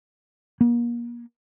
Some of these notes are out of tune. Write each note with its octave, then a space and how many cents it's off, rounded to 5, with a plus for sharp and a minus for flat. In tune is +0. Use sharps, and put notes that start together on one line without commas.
A#3 +35